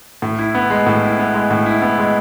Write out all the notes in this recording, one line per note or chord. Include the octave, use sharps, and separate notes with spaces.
A2
E4
B3
G#3
A2
E4
B3
G#3
A2
E4
B3
G#3